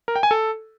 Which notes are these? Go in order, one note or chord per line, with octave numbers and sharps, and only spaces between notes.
A#4
G5
G#5
A4